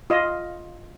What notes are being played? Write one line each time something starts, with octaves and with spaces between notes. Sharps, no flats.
F4 D#5